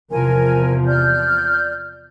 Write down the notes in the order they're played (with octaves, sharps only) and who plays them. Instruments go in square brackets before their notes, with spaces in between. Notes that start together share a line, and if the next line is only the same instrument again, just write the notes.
[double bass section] E2 C3 F3 [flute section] A#4 G#5
[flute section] D5 F6 G6